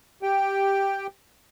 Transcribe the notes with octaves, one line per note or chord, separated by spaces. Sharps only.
G4 G5